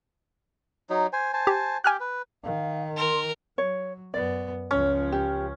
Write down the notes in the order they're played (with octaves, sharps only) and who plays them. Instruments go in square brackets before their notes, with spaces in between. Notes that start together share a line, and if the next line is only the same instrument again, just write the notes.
[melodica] F#3 D#4
C5 G#5
C5 G#5 A5
[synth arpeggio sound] G4
[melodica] G4 G5 [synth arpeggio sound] G#5 F6 F#6
[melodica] B4
[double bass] D#3 [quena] F5
[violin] A#4 [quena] C6
[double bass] F#3 [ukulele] C#5
[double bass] F#2 B3 [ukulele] D5
[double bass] C#2 F3 [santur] C#4
[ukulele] G4